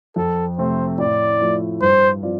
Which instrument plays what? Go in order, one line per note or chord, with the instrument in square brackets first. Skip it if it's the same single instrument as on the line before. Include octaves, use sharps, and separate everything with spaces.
[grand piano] F2 [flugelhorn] A4
[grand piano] C3 A3 C4 [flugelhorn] C5
[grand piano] A2 [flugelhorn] D5
[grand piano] F3 A3
[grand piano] G2 [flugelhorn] C5
[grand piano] F3 C4 F4 D5